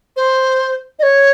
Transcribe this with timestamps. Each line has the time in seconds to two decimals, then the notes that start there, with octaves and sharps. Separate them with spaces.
0.16 C5
0.99 D#5
1.03 C#5